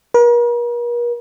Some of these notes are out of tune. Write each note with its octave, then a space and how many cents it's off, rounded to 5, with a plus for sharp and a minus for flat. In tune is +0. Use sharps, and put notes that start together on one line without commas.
A#4 +45